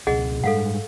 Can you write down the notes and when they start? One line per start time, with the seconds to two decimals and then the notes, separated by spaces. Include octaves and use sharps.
0.07 C#2 B2 G#4 D#5 F#5
0.44 G#2 G3 G#3 A4 F5 F#5